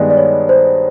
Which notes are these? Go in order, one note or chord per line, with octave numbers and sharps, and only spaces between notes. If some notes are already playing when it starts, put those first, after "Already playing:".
Already playing: G2 D#3 G#3 B3 D5 D#5
D5
C#5
C5